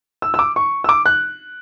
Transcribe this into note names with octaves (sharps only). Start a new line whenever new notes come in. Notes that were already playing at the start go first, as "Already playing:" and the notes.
E6
E6
D6
C#6
E6
D6
F#6